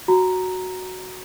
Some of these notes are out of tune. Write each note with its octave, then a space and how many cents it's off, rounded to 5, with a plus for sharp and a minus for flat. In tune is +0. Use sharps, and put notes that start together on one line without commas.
F#4 +0 A#5 +0